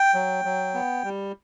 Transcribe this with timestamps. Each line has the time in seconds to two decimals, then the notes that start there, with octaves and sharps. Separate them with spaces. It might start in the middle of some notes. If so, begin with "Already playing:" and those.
Already playing: G5
0.14 F#3
0.45 F#3
0.74 B3
1.04 G3